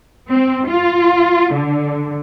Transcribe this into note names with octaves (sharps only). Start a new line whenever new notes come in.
C4
F4
D3